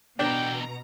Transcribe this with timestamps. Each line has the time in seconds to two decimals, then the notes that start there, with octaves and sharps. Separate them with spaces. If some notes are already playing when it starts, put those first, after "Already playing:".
0.19 E2 B2 D4 A4 G5 A#5